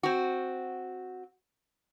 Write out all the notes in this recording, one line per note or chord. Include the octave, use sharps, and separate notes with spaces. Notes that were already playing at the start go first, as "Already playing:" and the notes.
C4 F#4